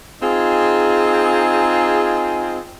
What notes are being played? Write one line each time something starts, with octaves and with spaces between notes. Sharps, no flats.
C4 D#4 F4 G#4